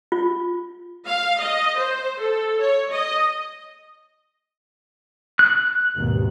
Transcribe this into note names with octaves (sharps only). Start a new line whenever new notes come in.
F4
F5
D#5
C5
A4
C#5
D#5
F#6
G#1 D#2 B2